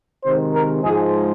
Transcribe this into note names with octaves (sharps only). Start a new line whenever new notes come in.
C3 D#3 G#3 C5
A#4
G#2 F3 G#3 G#4